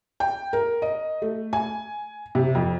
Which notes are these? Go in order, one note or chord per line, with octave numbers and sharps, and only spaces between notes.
G5
A#4
D#5
A3
G#5
C3
F2